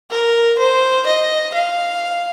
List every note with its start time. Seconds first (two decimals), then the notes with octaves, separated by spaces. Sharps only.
0.11 A#4
0.58 C5
1.07 D#5
1.54 F5